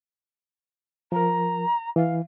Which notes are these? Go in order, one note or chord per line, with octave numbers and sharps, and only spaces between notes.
F3 A#4 A#5
E3 F5